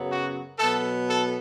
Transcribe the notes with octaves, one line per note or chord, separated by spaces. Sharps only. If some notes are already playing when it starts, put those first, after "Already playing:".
Already playing: F#2 C#3 F#3 B3
F#4
B2 F#3 B3 A4
A4